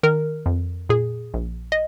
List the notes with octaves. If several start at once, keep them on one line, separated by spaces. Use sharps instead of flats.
D#3 A#4
F2
A#2 G#4
A#1
D#5